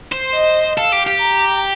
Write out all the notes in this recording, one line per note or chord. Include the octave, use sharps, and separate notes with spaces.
C5
D#5
A4 F5
G4
G4
A#5